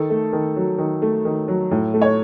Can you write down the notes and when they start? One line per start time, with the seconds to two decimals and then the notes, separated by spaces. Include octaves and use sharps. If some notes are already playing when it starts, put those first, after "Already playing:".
Already playing: D#3 A4
0.10 A3
0.33 D#3
0.56 F#3
0.78 D#3
1.02 A3
1.25 D#3
1.48 F#3
1.71 A2
1.94 A3
2.02 C#5